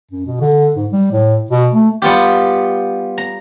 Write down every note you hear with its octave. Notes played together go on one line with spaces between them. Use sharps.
F#2
B2
D3
G#2
G3
A2
B2
A3
G3 B3 F4 G4
A#5